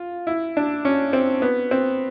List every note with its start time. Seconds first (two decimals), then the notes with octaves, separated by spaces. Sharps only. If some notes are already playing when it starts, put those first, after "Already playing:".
Already playing: F4
0.27 E4
0.57 D4
0.85 C#4
1.13 C4
1.42 B3
1.71 C4